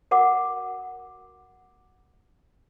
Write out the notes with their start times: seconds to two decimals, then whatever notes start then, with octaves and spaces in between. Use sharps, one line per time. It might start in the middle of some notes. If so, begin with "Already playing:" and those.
0.11 F#4 A#4 F#5 D6